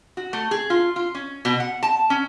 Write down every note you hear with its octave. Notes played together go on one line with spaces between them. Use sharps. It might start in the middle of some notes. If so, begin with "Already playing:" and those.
F#4
A3
G#4
F4
F4
C#4
B2
F#5
A5
C#4